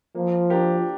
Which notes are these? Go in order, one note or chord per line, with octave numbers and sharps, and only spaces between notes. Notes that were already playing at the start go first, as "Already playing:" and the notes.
F3 A#3
D4 G4 A#4